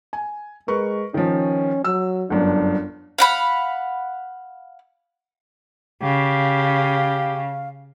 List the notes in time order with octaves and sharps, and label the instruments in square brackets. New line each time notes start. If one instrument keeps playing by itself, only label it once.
[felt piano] G#5
[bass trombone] G#3 [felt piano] A#4 B4 C#6
[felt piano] D#3 F3 [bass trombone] C#4
[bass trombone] F#3 [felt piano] E6
[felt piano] G1 F#2 [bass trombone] D4
[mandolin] F5 F#5 B5
[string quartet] C#3 [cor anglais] G4 [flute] F5